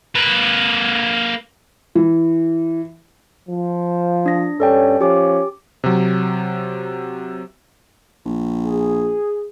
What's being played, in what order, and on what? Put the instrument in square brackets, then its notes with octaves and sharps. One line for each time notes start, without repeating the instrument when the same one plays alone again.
[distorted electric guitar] A#3 B4
[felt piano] E3
[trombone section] F3
[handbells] D4 A#6
[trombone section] G2 C#4 [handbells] A4 D5 G5
[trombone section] F3 C#4 [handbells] G4 D6
[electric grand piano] C3 F#3
[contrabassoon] A#1
[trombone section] G#4